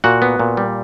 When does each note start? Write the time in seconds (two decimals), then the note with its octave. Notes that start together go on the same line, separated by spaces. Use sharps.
0.04 A#2 F#4 F#5
0.22 B3
0.39 A#2
0.57 G3